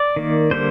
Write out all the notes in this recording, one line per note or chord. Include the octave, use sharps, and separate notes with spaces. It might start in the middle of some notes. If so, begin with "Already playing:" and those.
Already playing: D5
D#3 A#3
D3 G3 A#3 C5